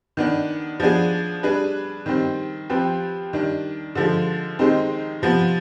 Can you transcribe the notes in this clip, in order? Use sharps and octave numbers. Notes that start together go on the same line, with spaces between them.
D#3 B3 D4
F3 B3 D4 G#4
G3 D4 G#4 B4
D#3 G3 C4
F3 C4 G4 B4
D#3 G3 D4
D3 F3 G#3
D#3 G#3 C4 D#4
C3 F3 B3